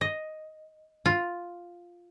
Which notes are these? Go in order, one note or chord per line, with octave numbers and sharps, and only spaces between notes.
D#5
F4